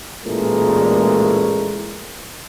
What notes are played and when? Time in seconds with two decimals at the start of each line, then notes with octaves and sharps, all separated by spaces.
0.25 A1 A#2 E3 G#3 A3 A#4